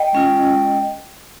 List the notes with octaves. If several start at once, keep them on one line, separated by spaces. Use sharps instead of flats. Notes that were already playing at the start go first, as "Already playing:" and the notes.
Already playing: D#5 G5
G#3 C#4 F4